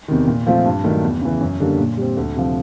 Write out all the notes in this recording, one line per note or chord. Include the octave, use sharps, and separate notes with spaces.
E2 C3 D#3
A#2
F3 A3 C4 F4
G2
D#3 F#3 A3 D4
E2
C#3 E3
F#2
D3 G3 A#3 D4
A#2
G3 C4
D2
C3 F3